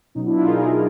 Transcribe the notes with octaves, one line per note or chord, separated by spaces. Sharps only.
B2 F#3 C#4 D#4
D4 E4
D#4 F4
G#4 A#4